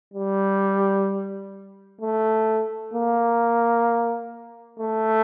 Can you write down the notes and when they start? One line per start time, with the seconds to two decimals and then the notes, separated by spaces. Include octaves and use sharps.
0.14 G3
2.01 A3
2.94 A#3
4.79 A3